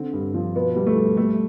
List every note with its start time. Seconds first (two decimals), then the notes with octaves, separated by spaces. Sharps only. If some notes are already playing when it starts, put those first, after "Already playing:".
Already playing: D3 C4
0.13 G2
0.34 F3
0.54 B2 B3
0.76 G3
0.86 A3
0.97 G3
1.17 G3 A3